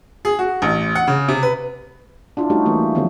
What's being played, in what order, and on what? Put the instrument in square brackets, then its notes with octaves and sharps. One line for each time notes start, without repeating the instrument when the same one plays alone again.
[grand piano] G#4
F#4
A1
F#5
C#3
C3
B4
[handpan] D4 E4 F4
G3 A3 C#4 D#4 F#4 G4
E3 A3 A#3 G4
D3 D#3 F3 F#3 B3 C4